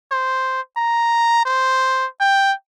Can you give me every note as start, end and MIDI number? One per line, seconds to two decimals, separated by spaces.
0.12 0.61 72
0.77 1.41 82
1.45 2.07 72
2.20 2.53 79